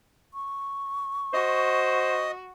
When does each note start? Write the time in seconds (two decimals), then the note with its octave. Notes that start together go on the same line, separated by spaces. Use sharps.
0.34 C#6
1.33 F#4 C5 D#5